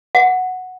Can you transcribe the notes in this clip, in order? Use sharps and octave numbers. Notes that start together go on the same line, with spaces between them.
F#5